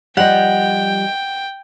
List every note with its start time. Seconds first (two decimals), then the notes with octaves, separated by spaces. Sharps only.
0.17 F3 G3 D5 D#5 F#5 G5